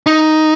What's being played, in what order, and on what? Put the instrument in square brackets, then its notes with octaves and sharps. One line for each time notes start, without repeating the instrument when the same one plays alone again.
[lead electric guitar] D#4